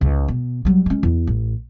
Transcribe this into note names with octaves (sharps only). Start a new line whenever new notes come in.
C#2
B2
F#3 G3
G#3 C#4
E2
A1